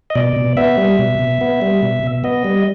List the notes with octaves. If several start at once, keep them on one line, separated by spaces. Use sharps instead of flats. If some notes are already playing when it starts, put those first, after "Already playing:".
D#5
B2 D5
B2
B3 E5
G3
B2
B2
B3
G3
B2
B2
B3 D#5
G3